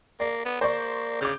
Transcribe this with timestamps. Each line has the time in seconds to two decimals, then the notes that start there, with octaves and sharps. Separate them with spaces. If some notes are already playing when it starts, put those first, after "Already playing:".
0.20 A#3 D5
0.45 B3
0.61 A#3 C5 D5 C#6
1.21 C#3 D6 G6